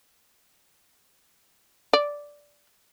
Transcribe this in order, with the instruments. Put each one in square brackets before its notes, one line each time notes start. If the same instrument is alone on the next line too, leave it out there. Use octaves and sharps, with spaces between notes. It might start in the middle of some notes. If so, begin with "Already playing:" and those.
[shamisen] D5